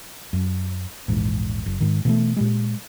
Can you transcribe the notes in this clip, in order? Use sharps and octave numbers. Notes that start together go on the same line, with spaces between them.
F#2
A#1 E2 G#2
F#1
G#2 D#3
B2 E3 G3 A3
A#2 G3 G#3